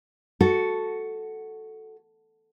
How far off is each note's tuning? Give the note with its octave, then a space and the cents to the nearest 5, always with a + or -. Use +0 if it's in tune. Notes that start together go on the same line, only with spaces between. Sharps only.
F#4 +0 A4 +0